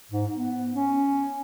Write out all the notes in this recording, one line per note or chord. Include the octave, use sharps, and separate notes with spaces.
G#2
B3
C#4